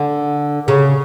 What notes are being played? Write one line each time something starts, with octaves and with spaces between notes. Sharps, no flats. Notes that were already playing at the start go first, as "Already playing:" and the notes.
Already playing: D3
C#3